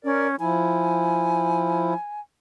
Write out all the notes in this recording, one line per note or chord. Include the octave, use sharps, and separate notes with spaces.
C#4 A#4 D5
F3 E4 G#5